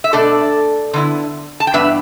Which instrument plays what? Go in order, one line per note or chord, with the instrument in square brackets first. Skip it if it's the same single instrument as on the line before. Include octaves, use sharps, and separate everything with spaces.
[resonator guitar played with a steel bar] E5
B2 A3 D4 A4 D5
D3 B3 E4
A5
G5
G2 E3 B3 D4 B4 E5